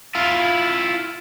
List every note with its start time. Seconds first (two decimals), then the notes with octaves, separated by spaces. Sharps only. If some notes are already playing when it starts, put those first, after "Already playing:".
0.15 E4 F4